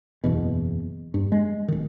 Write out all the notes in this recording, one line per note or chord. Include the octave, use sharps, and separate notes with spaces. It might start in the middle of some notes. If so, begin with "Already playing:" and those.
F#1 E2 B2
G2
G#3
D1 D#3